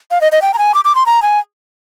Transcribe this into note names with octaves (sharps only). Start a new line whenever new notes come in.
F5
D#5
D#5
G5
A#5
G#5
D6
D6
C6
A#5
G#5